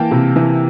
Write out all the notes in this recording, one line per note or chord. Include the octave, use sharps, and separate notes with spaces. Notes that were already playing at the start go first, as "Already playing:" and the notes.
Already playing: E3 A#3 G5 A5
C3
E3